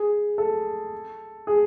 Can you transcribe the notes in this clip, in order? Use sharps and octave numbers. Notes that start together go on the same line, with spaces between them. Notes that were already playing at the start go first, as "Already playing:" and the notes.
Already playing: G#4
A4
G#4